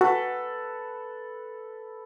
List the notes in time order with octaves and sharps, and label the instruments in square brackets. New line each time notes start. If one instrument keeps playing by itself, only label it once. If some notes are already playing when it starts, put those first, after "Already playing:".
[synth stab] F#4 [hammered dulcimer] A4 B4